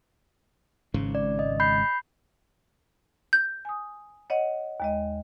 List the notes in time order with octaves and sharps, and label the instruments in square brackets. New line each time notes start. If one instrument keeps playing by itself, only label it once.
[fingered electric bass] G#1 G#2 C#3
[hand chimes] D5
D#5
B5 G6 C7
[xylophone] G6
[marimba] G#5 D#6
C#5 D#5 F#5
D#2 G#3 D#5